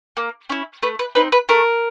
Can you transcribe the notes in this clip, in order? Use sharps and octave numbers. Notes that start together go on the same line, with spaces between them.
A#3
C#4 E4
A3 B4
B4
C4 D#4 B4
B4
A3 A#4